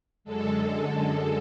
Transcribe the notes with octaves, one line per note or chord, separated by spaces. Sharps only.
F#2 D3 G#3 A4
A4
A4